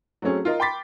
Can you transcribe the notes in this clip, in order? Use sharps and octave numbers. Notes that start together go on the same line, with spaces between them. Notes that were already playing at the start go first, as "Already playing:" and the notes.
F#3 A3 C4 C#4 G#4
F4 A#4 D#5
G5 B5 C6 D6 A6 B6